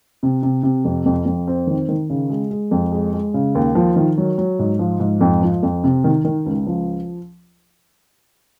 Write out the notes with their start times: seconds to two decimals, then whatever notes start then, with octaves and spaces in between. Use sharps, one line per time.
0.23 C3
0.43 C3
0.63 C3
0.85 F2
1.05 F2
1.26 F2
1.47 C4
1.67 D#3
1.89 D#3
2.10 C#3
2.30 G#3
2.51 G#3
2.71 F2
2.92 G#3
3.13 G#3
3.34 C#3
3.55 D#2
3.75 F3
3.96 D#3
4.18 F#3
4.38 F#3
4.59 G#2
4.79 F3
5.00 G#2
5.21 F2
5.42 F3
5.63 F2
5.84 C3
6.04 D#3
6.25 D#3
6.46 C#2
6.67 F3